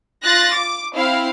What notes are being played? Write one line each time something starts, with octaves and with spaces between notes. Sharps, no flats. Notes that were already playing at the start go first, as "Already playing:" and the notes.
F4 F#6 A6 A#6
D6
C4 E4 F5